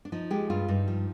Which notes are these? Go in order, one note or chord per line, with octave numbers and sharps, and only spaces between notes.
D4
F3 D#4
G#3 G4
G2 F4
G2 D#4
F3